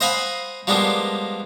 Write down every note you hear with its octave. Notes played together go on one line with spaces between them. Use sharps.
C5 D#5 F5 F#5 G#5 B5
F3 G3 G#3 A#3 B3 D4